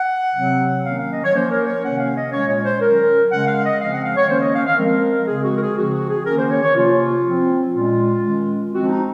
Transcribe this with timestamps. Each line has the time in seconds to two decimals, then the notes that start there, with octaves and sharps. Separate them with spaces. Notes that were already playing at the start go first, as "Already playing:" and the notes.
Already playing: F#5
0.34 C3 F#3 C4
0.84 D#3 F#3 A#3 C#4 F5
0.98 F5
1.12 D#5
1.24 C#5
1.34 F3 A#3 C#4 C5
1.49 A#4
1.67 C#5
1.83 C3 D#3 A#3 C#4 F#5
1.98 F5
2.16 D#5
2.32 A#2 G#3 C#4 C#5
2.48 C#5
2.64 C5
2.81 D#3 F#3 C#4 A#4
3.30 C#3 G#3 C#4 F#5
3.46 F5
3.64 D#5
3.79 C#3 F3 G#3 C4 F5
3.92 F#5
4.04 F5
4.17 C#5
4.29 D#3 A#3 C#4 C5
4.41 D#5
4.54 F5
4.66 F5
4.78 F3 G#3 C4 A#4
5.27 C#3 G#3 C4 G#4
5.43 F#4
5.56 A#4
5.61 G#4
5.77 C#3 F3 C4 F#4
5.93 F#4
6.10 G#4
6.25 D#3 A#3 C#4 A#4
6.38 C5
6.51 C#5
6.63 C#5
6.75 C3 F3 A#3 C#4 F4
7.24 F3 C4
7.73 A#2 G#3 C#4 F4
8.24 D#3 G#3 C#4
8.72 F3 G#3 C4 F#4
8.89 D#4